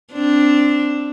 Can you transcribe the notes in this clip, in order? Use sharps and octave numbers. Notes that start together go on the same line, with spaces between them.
C4 D4